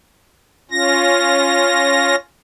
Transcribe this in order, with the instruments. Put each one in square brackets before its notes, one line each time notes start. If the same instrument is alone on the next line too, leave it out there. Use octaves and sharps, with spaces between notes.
[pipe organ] C#4 F4 A#6